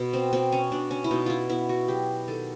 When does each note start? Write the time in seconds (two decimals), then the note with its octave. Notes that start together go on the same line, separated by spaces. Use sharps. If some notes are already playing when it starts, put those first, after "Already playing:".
Already playing: B2
0.13 C4
0.33 B2 C4
0.52 C#4
0.72 B2 D4
0.91 C#4
1.04 E4
1.11 B2 D#4
1.26 E4 F4
1.49 B3 E4
1.69 F#4
1.88 F#3 G4
2.28 D#3 A4